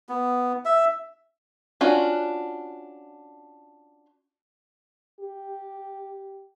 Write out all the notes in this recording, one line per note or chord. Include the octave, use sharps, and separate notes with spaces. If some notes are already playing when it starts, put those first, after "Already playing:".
B3
E5
C#4 D4 F4 F#4
G4